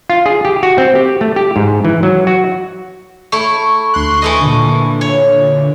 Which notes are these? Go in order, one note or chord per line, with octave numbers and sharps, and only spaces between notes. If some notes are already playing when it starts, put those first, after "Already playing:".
F4
G#4
G4
F#4
C4
G4
A3
G4
G#2
E3
F#3
F#4
A3 E4 C#6
D2 C6 F#6
E3 A3 D#5
A#2 D3
C#5